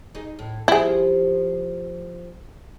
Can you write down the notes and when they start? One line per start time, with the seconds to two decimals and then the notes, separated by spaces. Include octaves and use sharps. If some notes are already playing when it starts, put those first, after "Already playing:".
0.15 D#4 G#4
0.39 A2
0.68 F3 E4 G4 G#4